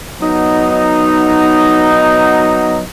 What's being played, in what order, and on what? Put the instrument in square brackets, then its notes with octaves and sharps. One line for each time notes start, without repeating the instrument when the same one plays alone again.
[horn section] F#3 B3 D#4